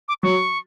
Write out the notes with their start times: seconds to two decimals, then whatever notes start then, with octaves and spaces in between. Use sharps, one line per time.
0.08 D6
0.23 F#3 C#6